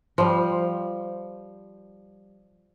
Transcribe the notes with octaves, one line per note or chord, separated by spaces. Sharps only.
F3 G3